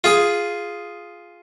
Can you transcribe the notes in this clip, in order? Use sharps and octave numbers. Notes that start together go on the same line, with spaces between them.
F4 G#4